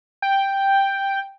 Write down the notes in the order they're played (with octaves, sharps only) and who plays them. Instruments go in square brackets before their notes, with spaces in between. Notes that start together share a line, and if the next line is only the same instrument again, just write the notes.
[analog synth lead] G5